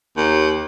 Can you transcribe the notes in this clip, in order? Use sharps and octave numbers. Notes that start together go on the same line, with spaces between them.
D#2